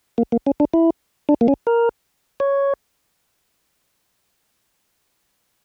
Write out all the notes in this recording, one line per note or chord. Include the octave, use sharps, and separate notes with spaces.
A#3
A#3
C#4
D4
E4
D4
A#3
C#4
A#4
C#5